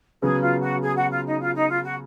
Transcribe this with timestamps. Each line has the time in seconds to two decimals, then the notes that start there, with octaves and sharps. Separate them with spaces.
0.22 C#3 F#3 B3 G#4
0.41 F4
0.61 F#4
0.81 G#4
0.95 F#4
1.10 F4
1.25 D#4
1.40 F4
1.55 D#4
1.69 F4
1.83 F#4